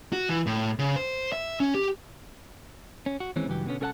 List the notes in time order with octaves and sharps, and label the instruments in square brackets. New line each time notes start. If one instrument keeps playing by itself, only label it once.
[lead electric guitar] F#4
E3
A2
C#3
C5
E5
C#4
G4
[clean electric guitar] C#4
F#4
D#2 E3 G#3 C4 C#4
C#2 G2 E3 F#3 G4
B2 D3 B3 C#4
C2 C#4 A4 A#4 F#5 A5